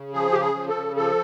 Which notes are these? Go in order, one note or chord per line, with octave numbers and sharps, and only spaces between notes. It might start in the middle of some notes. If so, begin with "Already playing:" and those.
Already playing: C#3
F3 G#4
C#3 G4
G#4
F3
A4
C#3
F3 A4